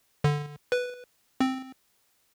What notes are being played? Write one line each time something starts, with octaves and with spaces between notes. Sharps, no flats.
D3
B4
C4